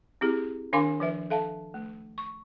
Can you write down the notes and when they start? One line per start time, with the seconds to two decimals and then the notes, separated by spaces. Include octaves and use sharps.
0.21 C4 E4 G4 G#4
0.73 D#3 D4 A#4 F5 G#5 D6
1.00 F3 B4 E5
1.30 A4 E5 F5 A5
1.74 A3
2.18 C#6